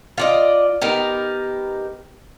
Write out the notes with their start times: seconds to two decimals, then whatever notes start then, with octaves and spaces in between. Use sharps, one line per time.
0.18 F4 D5 D#5
0.82 B3 D#4 G4 A#4